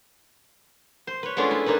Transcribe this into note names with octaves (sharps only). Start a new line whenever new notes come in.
C5
B4 C#5
G#3 A3 B3 C#4 D4 F4
E4
A#3 D4 D#4 B4